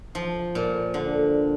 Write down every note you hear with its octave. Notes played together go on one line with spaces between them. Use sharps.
F3
A#2
D3